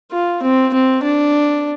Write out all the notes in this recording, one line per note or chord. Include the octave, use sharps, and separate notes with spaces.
F4
C4
C4
D4